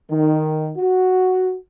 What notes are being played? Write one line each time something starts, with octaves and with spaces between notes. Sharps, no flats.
D#3
F#4